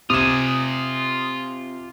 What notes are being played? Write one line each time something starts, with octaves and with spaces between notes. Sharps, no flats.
C3 F4 G#5 D#6 E7